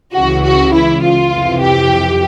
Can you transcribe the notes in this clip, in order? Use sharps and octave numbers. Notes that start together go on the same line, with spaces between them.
C#2 C#3 E3 F#4
F#4
E4
F4
F2 C3 E3
G4